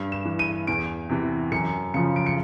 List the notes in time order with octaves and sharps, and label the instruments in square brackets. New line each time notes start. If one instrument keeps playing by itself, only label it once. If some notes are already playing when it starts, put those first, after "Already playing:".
Already playing: [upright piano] G2
E7
E3
D#7
E2 D7
C3 E3
F#2 C#7
C#3 F3 C#7
D7
C#7